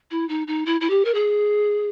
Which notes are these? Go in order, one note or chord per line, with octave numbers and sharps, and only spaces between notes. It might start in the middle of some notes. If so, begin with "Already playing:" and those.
E4
D#4
D#4
E4
E4
G4
A#4
G#4